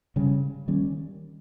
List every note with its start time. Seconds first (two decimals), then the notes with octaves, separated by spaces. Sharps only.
0.16 C#3 G3 C#4
0.68 D#3 G3 A#3 C#4